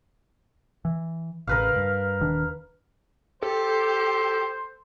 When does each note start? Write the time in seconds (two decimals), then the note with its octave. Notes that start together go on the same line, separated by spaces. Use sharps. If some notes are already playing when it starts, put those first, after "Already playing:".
0.85 E3
1.47 A1 C#3 A#4 B4 F5
1.76 G2
2.20 D#1 D#3 D4
3.43 G4 A4 C5